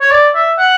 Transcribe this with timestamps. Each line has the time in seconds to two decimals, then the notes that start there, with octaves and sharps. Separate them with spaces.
0.01 C#5
0.11 D5
0.35 E5
0.58 F#5